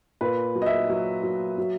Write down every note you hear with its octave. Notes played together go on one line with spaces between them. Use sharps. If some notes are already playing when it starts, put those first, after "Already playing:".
A#2 B4
F#3
D#5
E5
F#3
F#3
F#3